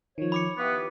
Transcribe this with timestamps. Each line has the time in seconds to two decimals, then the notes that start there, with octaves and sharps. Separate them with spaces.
0.18 D#3 F3 C#5
0.32 B5 D6 C#7
0.58 B3 E4 G4 B4 F5 C#6